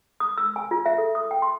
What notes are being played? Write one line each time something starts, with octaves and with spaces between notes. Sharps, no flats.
D#6
E6
G#5
F4
E5
A4
D#6
G5
C6